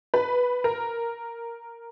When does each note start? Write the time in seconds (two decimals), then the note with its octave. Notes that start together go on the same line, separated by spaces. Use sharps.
0.14 B4
0.64 A#4